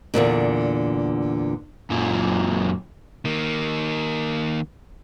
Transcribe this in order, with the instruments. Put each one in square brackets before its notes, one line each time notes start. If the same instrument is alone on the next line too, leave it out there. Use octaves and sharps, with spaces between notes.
[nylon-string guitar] E2 G2 A#2 D3
[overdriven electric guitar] F#2 A#2
[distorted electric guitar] D#3 A#3